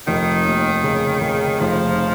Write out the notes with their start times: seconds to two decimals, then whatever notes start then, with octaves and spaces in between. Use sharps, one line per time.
0.07 F1 D#3
0.45 D#2
0.84 C#3
1.21 C#3
1.59 F1 F3